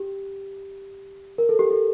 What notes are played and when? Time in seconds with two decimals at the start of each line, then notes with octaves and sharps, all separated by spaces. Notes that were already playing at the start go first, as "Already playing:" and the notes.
Already playing: G4
1.38 A#4
1.49 A4
1.59 G4
1.71 A4